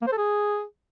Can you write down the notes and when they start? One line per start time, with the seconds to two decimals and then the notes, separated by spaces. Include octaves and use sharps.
0.02 A#3
0.07 C5
0.12 A4
0.18 G#4